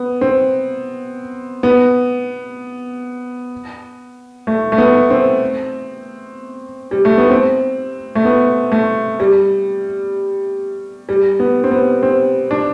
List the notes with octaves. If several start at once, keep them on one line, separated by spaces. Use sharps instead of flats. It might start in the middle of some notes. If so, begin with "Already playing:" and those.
Already playing: B3
C4
B3
A3
A3
B3
C4
G3
A3
B3
C4
A3
B3
A3
G3
G3
B3
C4
B3
C4
D4